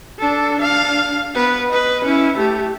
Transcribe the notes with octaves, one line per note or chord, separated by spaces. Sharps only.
D4 A4
D4 F5
B3 B4
B4 D#5
C#4 E4
A3 G4